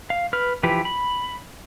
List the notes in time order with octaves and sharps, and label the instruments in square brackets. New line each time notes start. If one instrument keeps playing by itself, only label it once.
[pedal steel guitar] F5
B4 F6
E3 F3 G4 B4
B5